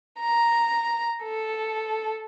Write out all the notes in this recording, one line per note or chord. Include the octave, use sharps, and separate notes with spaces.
A#5
A4